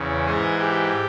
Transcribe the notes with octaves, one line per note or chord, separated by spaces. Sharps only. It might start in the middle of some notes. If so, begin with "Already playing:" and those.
Already playing: E2 C#3
G#2 E3 G#4
G4